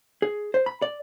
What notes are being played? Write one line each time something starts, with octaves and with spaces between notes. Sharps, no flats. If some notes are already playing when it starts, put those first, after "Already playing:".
G#4
C5
B5
D5